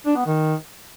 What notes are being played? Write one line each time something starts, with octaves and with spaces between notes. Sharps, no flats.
D4
B3
D#3